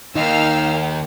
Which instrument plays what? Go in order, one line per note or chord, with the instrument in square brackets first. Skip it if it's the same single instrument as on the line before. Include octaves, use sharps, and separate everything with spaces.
[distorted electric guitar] D#2 [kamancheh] A#3 G5 [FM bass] D#4 [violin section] F5 E6 F6